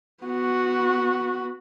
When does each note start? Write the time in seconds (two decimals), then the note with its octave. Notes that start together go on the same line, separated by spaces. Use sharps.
0.24 B3 F#4